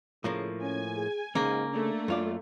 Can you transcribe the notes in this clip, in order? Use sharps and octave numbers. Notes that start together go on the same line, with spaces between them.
A2 C#3 F3 A#3
C#4 G#5
G#4
G#2 C#3 A#3 C#4
A3 D4
F#2 F4 D5